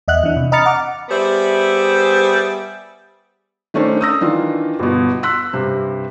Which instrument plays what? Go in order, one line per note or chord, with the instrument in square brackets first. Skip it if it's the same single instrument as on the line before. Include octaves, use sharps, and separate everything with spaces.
[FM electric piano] E2 D#5 E5 F#5 F#6
E3 D4
C3
D#5 A#5 B5 F6 A6 C#7
F#5 D6
[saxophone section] G3 B3 G#4 C5 E5
[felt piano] D#3 A3 C#4 D4 C5
D#6 E6 A#6
D#3 E3 D4 F4
G1 B2
C6 E6 F#6 B6
G2 C3 C5